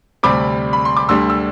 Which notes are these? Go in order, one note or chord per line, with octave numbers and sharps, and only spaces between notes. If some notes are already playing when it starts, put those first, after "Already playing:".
D2 C3 G3 C4 B5 D6
B5
C6
D6
D2 D3 G3 C6 E6
E6